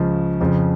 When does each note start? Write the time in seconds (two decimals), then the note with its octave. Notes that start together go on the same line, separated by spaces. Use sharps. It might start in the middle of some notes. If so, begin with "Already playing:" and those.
Already playing: C#2 C#3 F3
0.40 F2 C#3 F3